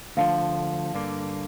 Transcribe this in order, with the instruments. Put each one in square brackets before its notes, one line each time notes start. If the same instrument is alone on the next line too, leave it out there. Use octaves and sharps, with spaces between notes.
[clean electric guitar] D2 D3 F3 [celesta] F5
[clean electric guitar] G2 D3 A#3